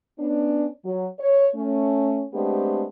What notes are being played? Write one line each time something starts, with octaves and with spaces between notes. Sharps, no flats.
B3 C#4 D4
F#3
C#5
A3 C#4
G#3 A3 B3 C4 D4 G4